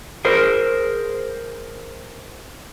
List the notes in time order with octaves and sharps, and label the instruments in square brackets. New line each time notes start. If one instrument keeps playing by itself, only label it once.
[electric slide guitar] G#4 A#4 C5